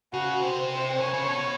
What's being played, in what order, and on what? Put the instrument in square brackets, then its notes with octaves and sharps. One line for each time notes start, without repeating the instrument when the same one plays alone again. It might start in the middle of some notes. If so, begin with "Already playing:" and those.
[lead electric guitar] C#3 [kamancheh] F#4
[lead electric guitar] C3 [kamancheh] C5
[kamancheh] C5
[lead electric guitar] C#3 [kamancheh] C#5
[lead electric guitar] C#3
B2